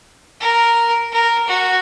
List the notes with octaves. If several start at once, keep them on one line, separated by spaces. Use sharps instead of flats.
A#4
A#4
F#4